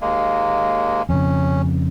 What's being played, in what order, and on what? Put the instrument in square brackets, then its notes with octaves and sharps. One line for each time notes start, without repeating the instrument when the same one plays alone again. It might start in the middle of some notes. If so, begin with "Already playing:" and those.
[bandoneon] D#2 G#3 A#3
[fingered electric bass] F2 C#3 [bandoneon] C#4